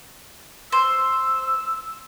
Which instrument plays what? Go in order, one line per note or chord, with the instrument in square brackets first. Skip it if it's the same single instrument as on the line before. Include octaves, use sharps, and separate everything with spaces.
[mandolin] C5 [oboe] E6